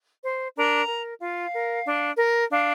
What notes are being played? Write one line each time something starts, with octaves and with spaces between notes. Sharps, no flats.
C5
D4 A#4 A#5
A#4
F4 F5
A#4
D4
A#4
D4 F5